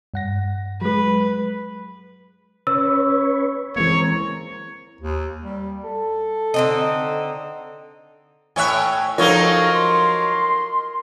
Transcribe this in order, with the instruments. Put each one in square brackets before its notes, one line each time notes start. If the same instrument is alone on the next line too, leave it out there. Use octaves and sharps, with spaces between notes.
[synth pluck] G2 F#5 A#6
[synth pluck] F#3 G#3 [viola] B4
[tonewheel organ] C#4 B4 C#5 [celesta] E6
[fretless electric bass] E3 G#3 A#3 [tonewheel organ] C4 A#4 [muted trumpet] C#5
[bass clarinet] D#2
G3
A4
[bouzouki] D3 C4 D#4
[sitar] A2 C#5 E5 [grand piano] G#5 F#6
[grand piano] F3 [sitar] F#3 D#4 C#5 [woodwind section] A4 F5 [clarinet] A#4
[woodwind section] C6